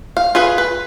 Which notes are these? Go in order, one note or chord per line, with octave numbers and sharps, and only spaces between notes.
F5
F4 G#4 B4
B4